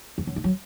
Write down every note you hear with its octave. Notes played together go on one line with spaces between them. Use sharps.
F2
F#2
D#3
F#3